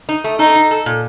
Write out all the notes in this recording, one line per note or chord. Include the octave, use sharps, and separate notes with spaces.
D#4
A3
D#4 A4
D#4
A4
A#2